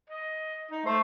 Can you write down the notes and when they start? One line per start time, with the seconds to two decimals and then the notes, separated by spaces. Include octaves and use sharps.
0.10 D#5
0.71 D#4
0.86 A3 C5